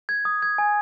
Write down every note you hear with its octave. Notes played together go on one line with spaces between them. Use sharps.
G#6
D#6
G#6
G#5